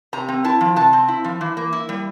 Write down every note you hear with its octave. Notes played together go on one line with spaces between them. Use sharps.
C3 A#5
C4
E4 A5
F3
C3 A5
C4
E4
F3
E3
A#3
E4
G3